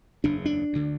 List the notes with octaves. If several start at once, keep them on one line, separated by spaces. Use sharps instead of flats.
F#1 E2 C#3 D4
D4
D2 D3